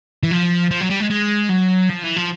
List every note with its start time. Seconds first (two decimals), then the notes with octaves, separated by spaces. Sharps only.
0.23 E3
0.31 F3
0.71 F3
0.81 F#3
0.90 G3
1.00 G#3
1.10 G#3
1.50 F#3
1.89 F3
2.03 E3
2.16 F3